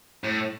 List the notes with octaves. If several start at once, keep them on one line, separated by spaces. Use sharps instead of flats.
A2